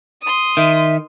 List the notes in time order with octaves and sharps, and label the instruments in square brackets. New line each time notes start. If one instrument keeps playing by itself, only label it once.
[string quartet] C6 D#6
[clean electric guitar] D#3 [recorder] E5